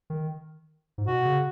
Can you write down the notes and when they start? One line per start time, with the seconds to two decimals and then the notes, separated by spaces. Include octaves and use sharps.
0.10 D#3
0.98 G#2
1.07 B2 F#4
1.25 C#3